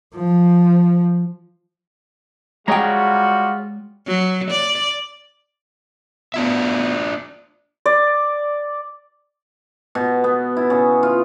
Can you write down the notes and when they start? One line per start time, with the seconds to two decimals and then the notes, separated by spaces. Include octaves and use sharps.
0.15 F3
2.68 G3 G#3 F4 F#4 G#4 C#5 G5 A#5
4.07 F#3
4.51 D5
6.34 B3 D4 F4 E5
7.86 D5
9.95 B2
10.24 B3
10.57 E4
10.70 C#3
11.03 F4